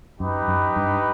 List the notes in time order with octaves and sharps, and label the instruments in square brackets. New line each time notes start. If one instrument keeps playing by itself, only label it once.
[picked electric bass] F#2 [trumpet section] D#4 G4 B4
[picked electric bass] F#2
G2